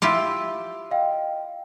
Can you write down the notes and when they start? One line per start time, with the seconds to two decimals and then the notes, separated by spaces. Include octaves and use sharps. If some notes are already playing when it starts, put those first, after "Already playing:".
0.02 E4 F4 G4 C6 E6
0.91 D#5 F5 G5